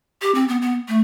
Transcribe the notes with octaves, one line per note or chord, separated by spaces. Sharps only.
G4
C4
B3
B3
A3